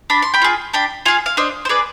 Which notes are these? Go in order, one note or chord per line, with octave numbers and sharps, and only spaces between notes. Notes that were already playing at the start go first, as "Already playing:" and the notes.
D4 B5
C6
G5 B5
F4 G#4
D4 G5 B5
F4 G#4 F5 G#5
F5
D4 C5 D#5
C5
G#4 B4 D5